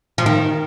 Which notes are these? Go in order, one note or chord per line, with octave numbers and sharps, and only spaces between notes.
F3
D#3